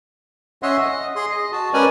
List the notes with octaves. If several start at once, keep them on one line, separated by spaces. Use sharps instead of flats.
C#4 C#5 D#5 E5 F#5 C6
D#5
G#4 C6
D#5
F#4 A5
G#3 C#4 A#4 B4 D5 G#5